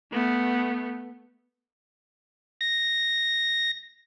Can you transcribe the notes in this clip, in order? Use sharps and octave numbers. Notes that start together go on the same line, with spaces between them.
A3 B3
A#6